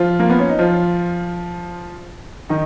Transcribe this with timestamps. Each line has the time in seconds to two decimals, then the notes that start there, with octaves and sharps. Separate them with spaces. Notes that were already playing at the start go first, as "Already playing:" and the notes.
Already playing: F3 F4
0.20 A#3
0.30 B3
0.39 C#4
0.49 D#4
0.59 F3 F4
2.49 D#3 D#4